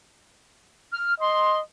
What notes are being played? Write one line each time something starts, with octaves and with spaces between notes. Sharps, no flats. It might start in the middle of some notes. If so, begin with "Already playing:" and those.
F6
D#5 C6